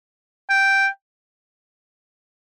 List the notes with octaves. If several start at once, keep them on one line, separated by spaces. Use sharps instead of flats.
G5